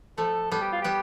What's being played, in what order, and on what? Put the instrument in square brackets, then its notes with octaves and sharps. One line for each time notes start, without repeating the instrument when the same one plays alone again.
[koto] F3 A3 [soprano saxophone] A4
[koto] G3 B3 [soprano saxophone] A4
[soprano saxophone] G4
F4
[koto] G3 B3 [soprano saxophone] G4